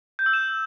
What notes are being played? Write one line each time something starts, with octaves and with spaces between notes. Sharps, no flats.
G6
E6
E7